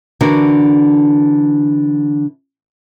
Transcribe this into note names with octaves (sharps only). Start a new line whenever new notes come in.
D3 E3 D4 F#4 A#4